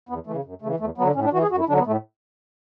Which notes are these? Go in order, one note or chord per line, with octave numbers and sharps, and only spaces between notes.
E2 B3
C#3 E3 A3
F#2
C#3 E3 A3
E2 A3
D3 F#3 B3
A2 C#4
D4
E3 F#4
G#4
F#2 F#4
E4
D3 F#3 D4
B3
A2 A3